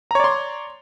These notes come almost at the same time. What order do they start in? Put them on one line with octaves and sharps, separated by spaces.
A#5 C#5 D5 C6